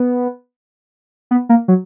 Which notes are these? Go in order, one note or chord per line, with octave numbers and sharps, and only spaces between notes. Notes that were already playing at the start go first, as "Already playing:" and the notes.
Already playing: B3
B3
A#3
F#3